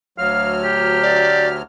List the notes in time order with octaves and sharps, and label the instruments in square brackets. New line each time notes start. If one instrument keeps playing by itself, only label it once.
[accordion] D2 F#3 F6 [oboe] F5
[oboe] G4
[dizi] D5